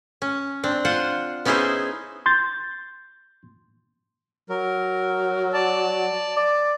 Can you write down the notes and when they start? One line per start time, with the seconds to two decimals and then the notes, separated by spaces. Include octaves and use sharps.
0.22 C#4
0.63 C4 D4
0.85 F4 C5 F#5
1.45 B3 C#4 D#4 E4 G#4 C5
2.26 C6 G6 A6
4.50 F#3 A#4
5.53 D5 A5
6.37 D5